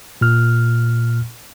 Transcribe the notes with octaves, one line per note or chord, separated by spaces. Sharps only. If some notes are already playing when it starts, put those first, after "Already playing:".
A#2 F6